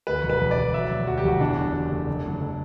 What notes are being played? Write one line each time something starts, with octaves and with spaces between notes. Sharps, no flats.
D2 B4
E1
B4
E1
D5
E1
F#3 E5
E1
D2 F#4
G4
E1 F#4
E2 D4
F#1
F#1
A3
F#1
F#1
A3